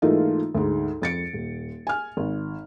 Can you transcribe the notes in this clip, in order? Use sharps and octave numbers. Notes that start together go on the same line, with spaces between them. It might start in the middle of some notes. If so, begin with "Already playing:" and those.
G#2 E3 A3 A#3 D#4 F4
D2 G#2
F2 A6 C#7 D7
D#1
G#5 F6
G#1